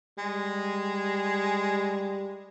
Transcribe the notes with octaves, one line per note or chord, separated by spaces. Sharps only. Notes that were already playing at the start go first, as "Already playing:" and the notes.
G3 G#3